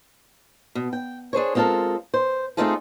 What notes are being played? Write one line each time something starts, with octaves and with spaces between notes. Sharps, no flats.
B2
G5
D4 G#4 C5 C#5
G#3 C4 F4 G4 A4 A#4
C5
A3 C4 D#4 F4 G#4 A4